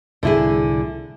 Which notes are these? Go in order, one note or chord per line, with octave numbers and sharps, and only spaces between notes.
C2 A2 D3 E3 E4 G#4